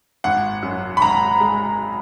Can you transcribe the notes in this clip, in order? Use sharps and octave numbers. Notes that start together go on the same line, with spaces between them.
G#1 F#5
F#2
B5
G#1 A#5
G#3